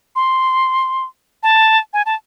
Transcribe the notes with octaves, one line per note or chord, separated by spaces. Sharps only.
C6
A5
G#5
A5